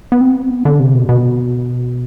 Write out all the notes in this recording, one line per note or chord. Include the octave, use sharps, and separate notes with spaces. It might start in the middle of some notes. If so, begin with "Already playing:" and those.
B3
C4
B3
D3
C3
B2
B2